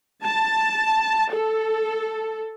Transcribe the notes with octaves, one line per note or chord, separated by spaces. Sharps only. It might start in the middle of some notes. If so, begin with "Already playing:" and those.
A5
A4